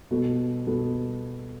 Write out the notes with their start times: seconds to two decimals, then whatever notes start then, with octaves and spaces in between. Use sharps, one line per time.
0.11 B2 G3 B3 F#4 A4
0.67 B2 G3 B3 F#4 A4